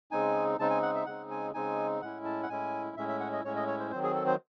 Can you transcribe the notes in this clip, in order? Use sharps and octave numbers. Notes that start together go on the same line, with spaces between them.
C#3 G#3 C4 D#4 G#5
C#3 G#3 C4 D#4 A5
G#5
F#5
E5
C#3 G#3 C4 D#4 F#5
G#5
C#3 G#3 C4 D#4 G#5
A2 G#3 C#4 E4 F#5
A5
F#5
A2 G#3 C#4 E4 G#5
A2 G#3 C#4 E4 E5
E5
F#5
D#5
A2 G#3 C#4 E4 C#5
D#5
C#5
C5
D#3 F#3 C4 C5
G#4
A4
C5